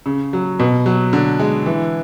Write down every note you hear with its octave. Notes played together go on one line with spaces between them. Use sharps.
C#3
F#3
B2
F#3
D3
G#3
E3